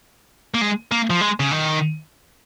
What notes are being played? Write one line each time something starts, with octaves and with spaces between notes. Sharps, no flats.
A#3
G#3
A#3
F3
G#3
C#3
D#3